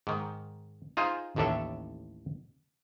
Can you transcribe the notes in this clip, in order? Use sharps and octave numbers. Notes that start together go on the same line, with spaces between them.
G#2 D#3
D#4 F4 G#4 C5
A1 D#2 A2 D4 A4 E5